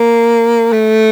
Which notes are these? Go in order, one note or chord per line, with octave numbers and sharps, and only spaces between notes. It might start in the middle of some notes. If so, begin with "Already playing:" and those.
Already playing: A#3
A3